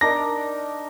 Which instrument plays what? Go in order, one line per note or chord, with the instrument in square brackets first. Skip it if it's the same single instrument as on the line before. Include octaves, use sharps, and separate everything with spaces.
[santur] D4 D#4 A#4 [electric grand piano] A#6